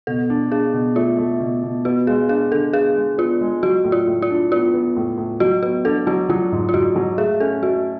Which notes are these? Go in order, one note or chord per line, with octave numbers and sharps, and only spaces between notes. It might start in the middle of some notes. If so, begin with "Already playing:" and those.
B2 A4
D4
D4 G#4
B2
A3 F4
A3
B2
B2
B3 F#4
G#3 G#4
D4 G#4
D3 A4
B3 G#4
G#3
B3 F4
G#3
F#3 F#4
A2
F4
A2
F4
D4
B3 F4
B3
A2
A2
F#3 F#4
B3 F#4
D4 A4
F#3 F#4
F#3 F4
G#2
F4
G#2 F#4
F#3
A3 G#4
C#4 A4
A3 F#4